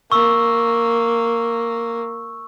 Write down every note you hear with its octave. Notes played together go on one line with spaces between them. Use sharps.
A#3 C#6 E6